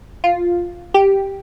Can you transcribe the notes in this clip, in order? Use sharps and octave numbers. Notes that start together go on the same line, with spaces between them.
F4
G4